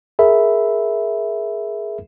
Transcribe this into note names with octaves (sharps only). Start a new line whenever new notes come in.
G#4 A#4 E5 B5